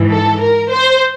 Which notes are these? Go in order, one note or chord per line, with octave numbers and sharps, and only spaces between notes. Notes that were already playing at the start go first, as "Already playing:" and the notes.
Already playing: G#2 E3
A4
A#4
C5